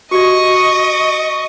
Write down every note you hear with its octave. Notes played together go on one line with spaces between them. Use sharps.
F#4 G4 D5 D#5 C#6